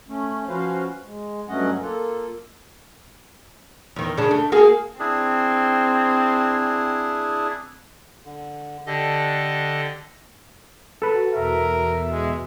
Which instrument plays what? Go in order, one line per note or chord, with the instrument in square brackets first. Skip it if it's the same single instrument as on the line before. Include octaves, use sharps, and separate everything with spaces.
[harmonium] A3 C#4
F3 C#4 F#4 B4 C5 F5
G#3
G2 F#3 A3 C#4 D#5 F#5
A#3 F4 A4
[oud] E2 D#3
C#3 D4
A3
A#3 F#4 G#4
[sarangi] C4 [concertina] D4 E4 G#4
[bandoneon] D3
[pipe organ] D3 D#5 [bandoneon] D4 G4 A4
[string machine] F#4 [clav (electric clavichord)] A4 B4
[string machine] E2 B2 [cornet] A#4 [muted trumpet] E5
[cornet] G#3